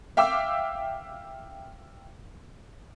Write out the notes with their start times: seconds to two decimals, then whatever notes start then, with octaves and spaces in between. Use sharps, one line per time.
0.17 E5 F5 G5 D6 E6